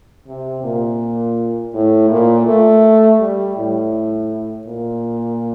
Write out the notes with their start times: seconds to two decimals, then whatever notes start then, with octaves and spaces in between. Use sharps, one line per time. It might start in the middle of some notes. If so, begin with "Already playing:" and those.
0.28 C3
0.64 A#2
1.74 A2
2.10 A#2
2.47 A3
3.20 G3
3.57 A2
4.67 A#2